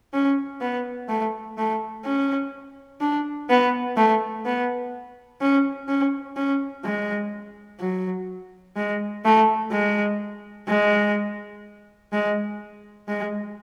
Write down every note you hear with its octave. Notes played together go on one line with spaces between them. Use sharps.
C#4
B3
A3
A3
C#4
D4
B3
A3
B3
C#4
C#4
C#4
G#3
F#3
G#3
A3
G#3
G#3
G#3
G#3